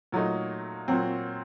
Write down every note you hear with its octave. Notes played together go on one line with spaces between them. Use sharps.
A#2 F#3 A3 D#4
A#2 F#3 C4